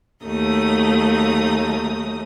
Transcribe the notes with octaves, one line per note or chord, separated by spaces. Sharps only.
D#2 F#3 A3 D#4 D#6